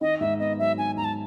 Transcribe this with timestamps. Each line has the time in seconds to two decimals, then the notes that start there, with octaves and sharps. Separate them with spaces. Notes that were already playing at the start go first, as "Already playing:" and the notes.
0.01 D#3 D#5
0.20 G#2 E5
0.40 B3 D#5
0.59 F#3 E5
0.78 D#3 G#5
0.97 G#2 A#5
1.04 A5